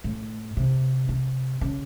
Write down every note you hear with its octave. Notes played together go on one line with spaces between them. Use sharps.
A2
C3
C3
C#3